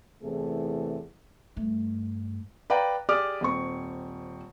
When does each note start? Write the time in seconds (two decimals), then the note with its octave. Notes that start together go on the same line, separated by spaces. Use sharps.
0.22 E2 C3 E3 A3 G#4
1.56 G2 A3
2.70 B4 D5 F5 G5 A#5
3.09 G4 G#4 D5 D6 D#6 F6
3.41 D#1 C4 C#6